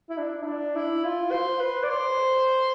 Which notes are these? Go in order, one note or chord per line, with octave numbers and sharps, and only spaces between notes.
E4
D4
E4
D4
E4
F4
C5
B4
D5
C5